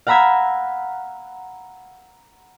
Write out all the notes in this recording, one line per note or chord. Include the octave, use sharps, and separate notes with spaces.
F5 F#5 A#5 B5 E6 G#6